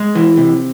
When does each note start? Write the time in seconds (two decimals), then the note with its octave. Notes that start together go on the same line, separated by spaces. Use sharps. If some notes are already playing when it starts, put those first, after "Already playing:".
Already playing: G#3
0.15 E3
0.37 C3